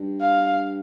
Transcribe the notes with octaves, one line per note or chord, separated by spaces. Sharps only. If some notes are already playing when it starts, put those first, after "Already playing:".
Already playing: G2
F5